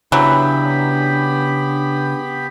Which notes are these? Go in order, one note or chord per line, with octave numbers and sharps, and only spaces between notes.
C#3 E3 F#3 B3 D4 G4 B5